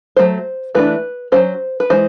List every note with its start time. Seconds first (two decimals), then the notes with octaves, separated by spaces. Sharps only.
0.16 F#3 A3 C5
0.75 E3 A3 D4 B4
1.32 F#3 A#3 C#4 C5
1.80 B4
1.90 E3 G#3 C5